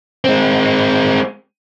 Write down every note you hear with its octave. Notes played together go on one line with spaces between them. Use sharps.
G#3 C4